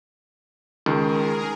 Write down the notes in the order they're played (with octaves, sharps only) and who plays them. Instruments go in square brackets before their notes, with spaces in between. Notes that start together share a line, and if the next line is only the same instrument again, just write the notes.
[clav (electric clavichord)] C#2 [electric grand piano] D#3 [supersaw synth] G#4 A#4